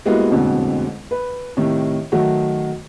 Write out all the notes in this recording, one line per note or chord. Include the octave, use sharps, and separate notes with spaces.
G3 G#3 A#3 B3 E4 F#4
E1 A1 F2 B2 D3
B4
A2 C3 D#3
D#3 F#3 A3 F#4